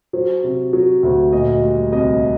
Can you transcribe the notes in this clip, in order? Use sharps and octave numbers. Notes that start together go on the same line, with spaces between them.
F#3 C5
C3
F#3
D2
A#2 D#5
G3
C2 D#5